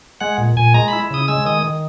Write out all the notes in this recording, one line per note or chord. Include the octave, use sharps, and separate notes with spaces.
G#3 F#5
A#2
A#2 G#5
G#3 A#5
E4 B5
C#3 D#6
G#3 E6
D#3 D#6
D#3